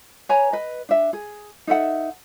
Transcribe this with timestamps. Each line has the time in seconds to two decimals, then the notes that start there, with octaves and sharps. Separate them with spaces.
0.29 B4 C#5 G#5 A#5
0.52 B4 D#5
0.89 D4 E5
1.13 G#4
1.67 D#4 A4 E5 F#5